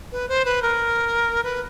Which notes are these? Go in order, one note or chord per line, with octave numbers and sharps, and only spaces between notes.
B4
C5
B4
A#4
B4